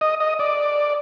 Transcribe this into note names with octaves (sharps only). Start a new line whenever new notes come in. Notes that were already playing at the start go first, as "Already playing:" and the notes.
D#5
D#5
D5